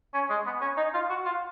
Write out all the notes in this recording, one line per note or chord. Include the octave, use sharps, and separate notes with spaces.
C#4
G#3
B3
C#4
D#4
F4
F#4
F4